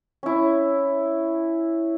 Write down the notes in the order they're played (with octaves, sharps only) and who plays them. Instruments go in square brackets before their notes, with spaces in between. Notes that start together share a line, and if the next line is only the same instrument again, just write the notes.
[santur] C#4 E4